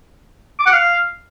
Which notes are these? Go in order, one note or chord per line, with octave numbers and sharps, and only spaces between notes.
D6
F#5
F5